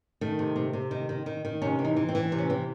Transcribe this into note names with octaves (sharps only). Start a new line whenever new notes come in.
D#3 A3
C3
C3
C3
D#3
D#3
D#3
D#3
C3 C#4
E3
D#4
E3
C4
E3
C3
C#4
E3 C4